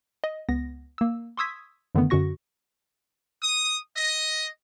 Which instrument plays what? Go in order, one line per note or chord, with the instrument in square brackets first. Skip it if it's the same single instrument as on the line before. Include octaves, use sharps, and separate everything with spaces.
[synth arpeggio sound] D#5
C#2 B3 A#6
A#3 E6
C6 C#6 D#6 E6 G#6 B6
F#2 D3 D#3 A3 B3
F#2 D3 F#4 C#6 A#6
[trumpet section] D#6
D#5